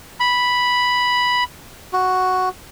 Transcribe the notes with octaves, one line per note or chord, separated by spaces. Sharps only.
B5
F#4